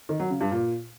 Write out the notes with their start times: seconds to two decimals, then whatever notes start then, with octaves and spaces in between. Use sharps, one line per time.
0.09 D#3
0.20 F#3
0.30 C#3
0.41 G2
0.51 A#2